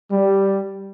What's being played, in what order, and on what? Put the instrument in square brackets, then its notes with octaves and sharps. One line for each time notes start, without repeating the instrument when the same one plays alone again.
[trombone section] G3